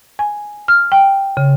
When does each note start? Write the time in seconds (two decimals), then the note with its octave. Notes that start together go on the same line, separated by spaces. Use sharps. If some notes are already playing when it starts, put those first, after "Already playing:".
0.19 G#5
0.68 F6
0.92 G5
1.37 C#3